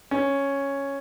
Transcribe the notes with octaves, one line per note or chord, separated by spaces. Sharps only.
C#4